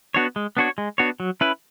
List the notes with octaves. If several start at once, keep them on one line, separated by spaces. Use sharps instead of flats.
B3 D4 F#4 C#5
G#3
B3 D4 F#4 C#5
G#3
B3 D4 F#4 C#5
F#3
C#4 E4 B4